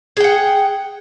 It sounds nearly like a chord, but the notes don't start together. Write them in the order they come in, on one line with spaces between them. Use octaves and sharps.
G#4 G5 F#5